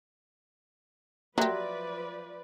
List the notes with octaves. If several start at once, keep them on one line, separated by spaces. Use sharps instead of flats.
F3 F#3 A#3 G4 B4 D5 E5 C6